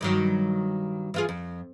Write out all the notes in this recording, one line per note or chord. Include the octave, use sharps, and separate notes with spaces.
G2 D#3 F#3
E3 F4 G#4
F2